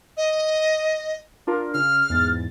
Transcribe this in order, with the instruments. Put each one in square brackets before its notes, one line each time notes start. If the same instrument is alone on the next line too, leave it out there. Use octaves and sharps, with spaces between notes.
[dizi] D#5
[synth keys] D4 F4 A#4
[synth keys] C#3 [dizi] F6
[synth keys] E2 G#2 A6